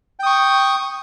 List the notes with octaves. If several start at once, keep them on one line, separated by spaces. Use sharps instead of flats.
G5 C#6 D#6